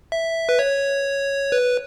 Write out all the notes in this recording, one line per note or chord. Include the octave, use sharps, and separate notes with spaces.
E5
B4
C#5
B4